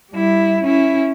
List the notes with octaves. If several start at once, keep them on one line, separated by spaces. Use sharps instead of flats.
G3 E4
C#4 E4